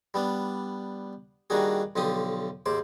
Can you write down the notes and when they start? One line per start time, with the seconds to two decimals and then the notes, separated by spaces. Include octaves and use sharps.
0.14 G3 B3 D4
1.50 D#3 G3 A#3 D4 F#4 G#4
1.96 B1 D3 F3 G4 D#6
2.66 D#2 G#2 C5 D6